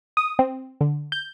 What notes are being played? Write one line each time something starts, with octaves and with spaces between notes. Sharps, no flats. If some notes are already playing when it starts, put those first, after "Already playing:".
D#6
C4
D3
G6